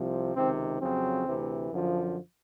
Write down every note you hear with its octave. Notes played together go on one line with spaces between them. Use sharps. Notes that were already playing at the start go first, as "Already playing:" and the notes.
Already playing: C2 C3 F3
C#2 C3 D#3 C4
F2 C#3 F#3 C4
D2 C3 E3
F#2 D3 F3